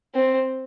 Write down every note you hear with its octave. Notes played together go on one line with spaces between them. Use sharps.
C4